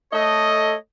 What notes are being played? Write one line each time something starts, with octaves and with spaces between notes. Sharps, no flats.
A3 A4 C#5 D#5